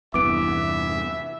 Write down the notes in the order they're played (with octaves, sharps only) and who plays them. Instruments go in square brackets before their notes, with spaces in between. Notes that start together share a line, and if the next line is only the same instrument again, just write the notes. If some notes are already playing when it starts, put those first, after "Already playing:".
[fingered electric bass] E2 G2 C3 [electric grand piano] E3 B3 [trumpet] E5 [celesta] D6 D7